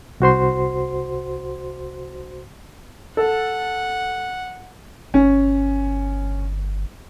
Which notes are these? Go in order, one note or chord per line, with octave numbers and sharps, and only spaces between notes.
C2 F#4 C5 C6
A4 F#5
G1 C#4